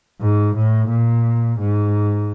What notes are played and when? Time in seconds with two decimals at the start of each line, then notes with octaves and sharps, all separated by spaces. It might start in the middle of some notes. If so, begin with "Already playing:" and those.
0.21 G#2
0.56 A2
0.90 A#2
1.59 G#2